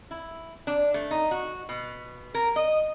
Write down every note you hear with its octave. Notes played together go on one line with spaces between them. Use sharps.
E4
D4
A3
D#4
F#4
B2
A#4
D#5